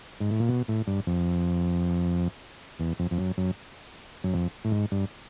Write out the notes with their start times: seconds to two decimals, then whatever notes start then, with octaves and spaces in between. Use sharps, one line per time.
0.21 G#2
0.31 A2
0.40 A#2
0.49 B2
0.68 A2
0.87 G2
1.07 F2
2.79 E2
2.99 F2
3.11 F2
3.18 F#2
3.38 F#2
4.24 F#2
4.34 F2
4.65 A2
4.72 G#2
4.92 G2